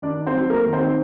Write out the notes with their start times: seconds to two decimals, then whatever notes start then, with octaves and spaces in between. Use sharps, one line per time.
0.02 D#3 D4 D5
0.18 D#4
0.27 C4 C5
0.34 F#3
0.50 A3 A#3 A#4
0.66 D#3
0.73 C4 C5
0.81 D#4